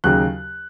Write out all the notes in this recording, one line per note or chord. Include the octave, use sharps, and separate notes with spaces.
D#2 C#3 F#3 F#6